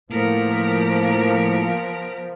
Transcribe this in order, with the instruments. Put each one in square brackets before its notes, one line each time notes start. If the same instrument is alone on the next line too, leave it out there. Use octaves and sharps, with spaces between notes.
[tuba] A2 [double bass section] F3 [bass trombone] A#3 [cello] B3 A#4